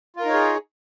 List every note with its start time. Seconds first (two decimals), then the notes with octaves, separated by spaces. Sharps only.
0.17 F4
0.21 A#4
0.25 D#4
0.29 C#5
0.33 G#4